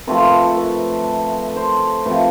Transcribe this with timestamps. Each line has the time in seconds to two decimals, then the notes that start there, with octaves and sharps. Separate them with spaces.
0.07 C3 F3 A3 B4
0.20 A4
0.32 B4
0.57 B4
1.56 C5
2.06 C3 F3 A3 B4